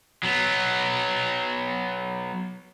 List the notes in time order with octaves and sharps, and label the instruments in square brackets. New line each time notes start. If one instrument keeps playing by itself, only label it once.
[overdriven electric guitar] F#3 B3